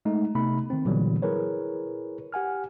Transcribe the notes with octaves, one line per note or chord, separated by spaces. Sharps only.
G#3 A3 D#4
C3 A3 B3 D#4 B5
D#3 C4
A#2 D3 E3 F#3 G3 B3
E4 G#4 A#4 B4 C#5
G4 F#5 G#5 F6